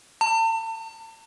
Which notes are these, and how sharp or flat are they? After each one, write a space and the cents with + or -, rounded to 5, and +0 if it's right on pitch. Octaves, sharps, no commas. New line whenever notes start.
A5 +40